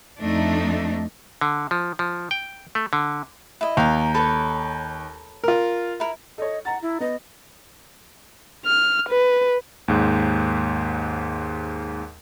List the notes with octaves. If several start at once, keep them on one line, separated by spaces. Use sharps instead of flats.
F2 A3 D4 D#4
D3
F3
F3
G5
A3
D3
E4 D#5
D#2 F5 A#5
A4 B4 C#5
F4 A#4
E4 A#4
A4 C#5 D#5
F#5 A#5 A6
E4
B3 D#5
F6
B4
D#2 G#2